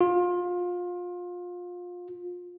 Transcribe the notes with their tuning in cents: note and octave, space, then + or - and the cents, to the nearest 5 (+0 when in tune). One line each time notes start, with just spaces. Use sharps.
F4 +25